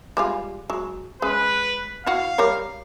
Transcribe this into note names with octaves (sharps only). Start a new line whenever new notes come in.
G3 G#3 F4
F#3 G#3
G#3 C#4 B4
E4 F#4 F5
G3 A#4 C#5